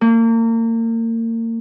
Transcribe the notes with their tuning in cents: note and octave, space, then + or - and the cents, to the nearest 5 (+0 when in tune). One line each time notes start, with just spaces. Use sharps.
A#3 -35